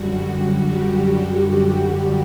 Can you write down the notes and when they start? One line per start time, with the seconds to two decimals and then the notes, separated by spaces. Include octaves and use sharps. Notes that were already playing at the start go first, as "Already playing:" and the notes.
Already playing: F#2 D3 G3 F#4
0.66 G4